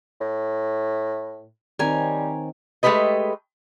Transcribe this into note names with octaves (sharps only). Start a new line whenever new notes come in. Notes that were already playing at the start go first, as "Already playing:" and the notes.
A2
D#3 G3 C4 D#4 A#4 C#5 G#5
G#3 A3 E4 G4 B4 D#5